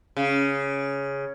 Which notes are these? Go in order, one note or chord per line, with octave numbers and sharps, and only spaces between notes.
C#3